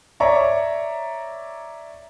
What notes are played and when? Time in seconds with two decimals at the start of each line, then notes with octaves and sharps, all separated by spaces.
0.20 C#5 D5 E5 A#5 C#6